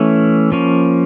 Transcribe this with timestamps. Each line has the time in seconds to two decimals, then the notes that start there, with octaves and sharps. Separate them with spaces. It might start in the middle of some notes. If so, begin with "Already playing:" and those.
Already playing: E3 A3 C#4
0.52 F3 A#3 C#4